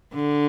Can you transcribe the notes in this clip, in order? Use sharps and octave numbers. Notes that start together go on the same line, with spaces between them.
D3